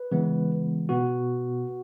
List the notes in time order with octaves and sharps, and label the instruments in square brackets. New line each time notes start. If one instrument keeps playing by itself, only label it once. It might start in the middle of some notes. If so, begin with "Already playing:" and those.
Already playing: [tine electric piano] B4
C#3 E3 G#3 B3
B2 B3 F#4